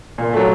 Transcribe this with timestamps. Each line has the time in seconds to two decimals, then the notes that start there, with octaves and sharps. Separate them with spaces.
0.18 A#2
0.33 F#3 A3